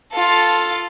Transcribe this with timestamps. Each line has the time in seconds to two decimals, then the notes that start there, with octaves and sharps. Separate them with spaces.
0.12 F4 A4